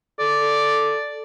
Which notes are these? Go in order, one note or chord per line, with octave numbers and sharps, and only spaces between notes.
A4 D5